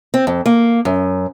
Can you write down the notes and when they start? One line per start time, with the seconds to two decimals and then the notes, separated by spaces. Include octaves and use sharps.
0.14 C4
0.27 F2
0.46 A#3
0.85 F#2